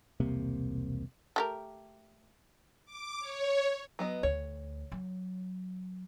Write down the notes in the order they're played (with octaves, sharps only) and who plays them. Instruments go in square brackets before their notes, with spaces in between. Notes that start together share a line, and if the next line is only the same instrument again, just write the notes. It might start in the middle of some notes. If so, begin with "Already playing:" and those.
[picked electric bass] E1 C2 C3 A#3
[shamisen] A3 G4 A#4
[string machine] D6
C#5
[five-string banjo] F#3 B3 D#5
[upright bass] D2 [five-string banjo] C#5
[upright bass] F#3